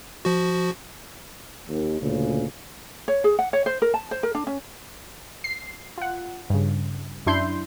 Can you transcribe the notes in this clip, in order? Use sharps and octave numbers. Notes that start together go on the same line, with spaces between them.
F3 F#4
D#2
D2 A#2 C#3
C#5
G#4
F#5
C#5
C5
A#4
A5
C5
A#4
D4
C#4
C7
F4 F#5
G2 C#3
F#2 D4 E4 C6 G6